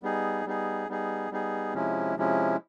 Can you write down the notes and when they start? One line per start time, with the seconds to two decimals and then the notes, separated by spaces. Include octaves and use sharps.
0.03 G3 B3 D#4 G#4
0.45 G3 B3 D#4 G#4
0.89 G3 B3 D#4 G#4
1.31 G3 B3 D#4 G#4
1.74 C3 F3 G#3 C#4 E4
2.16 C3 F3 G#3 C#4 E4